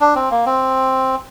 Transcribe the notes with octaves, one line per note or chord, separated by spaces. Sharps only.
D4
C4
A#3
C4